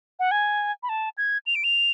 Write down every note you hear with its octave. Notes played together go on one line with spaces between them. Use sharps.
F#5
G#5
B5
A5
G#6
F7
D7
F7